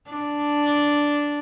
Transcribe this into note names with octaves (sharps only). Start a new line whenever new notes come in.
D4